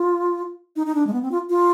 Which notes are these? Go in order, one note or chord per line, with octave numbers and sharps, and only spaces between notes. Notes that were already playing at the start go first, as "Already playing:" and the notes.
Already playing: F4
D#4
D#4
D4
G#3
B3
C4
F4
F4